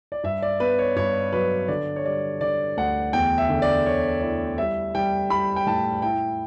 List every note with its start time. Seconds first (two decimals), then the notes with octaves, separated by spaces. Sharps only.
0.12 D5
0.24 G2 E5
0.42 D5
0.60 B3 B4
0.79 C#5
0.96 G2 C#5
1.32 F#3 B4
1.68 D3 D5
1.96 C#5
2.05 G3 D5
2.41 D3 D5
2.77 D2 F#5
3.13 E2 G5
3.38 E5
3.49 D3
3.62 D5
3.85 D3 C#5
4.21 E4 D5
4.58 G3 E5
4.95 G3 G5
5.30 G3 B5
5.56 G5
5.67 A2 A5
6.02 E4 G5